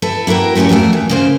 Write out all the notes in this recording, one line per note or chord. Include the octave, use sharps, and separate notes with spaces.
E4 A4 B4
A#3 E4 F#4 A#4 G5
F3 A3 C#4 G4 A#4
F2 F#3 A3 A#4
E3
C#3 A#3 C5